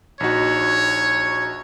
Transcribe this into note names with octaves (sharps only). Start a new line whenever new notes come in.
A#1 D#4 F#4 C#5